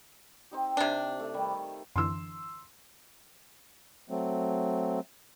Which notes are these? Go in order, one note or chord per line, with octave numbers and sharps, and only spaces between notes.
C4 D#4 G4
C3 D4
A3
D#3 G3
F#2 D3 E3 C6 E6
F#3 A3 C4